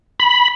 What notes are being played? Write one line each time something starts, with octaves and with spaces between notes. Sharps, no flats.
B5